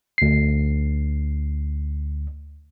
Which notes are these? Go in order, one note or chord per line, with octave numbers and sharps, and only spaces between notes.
D2 C7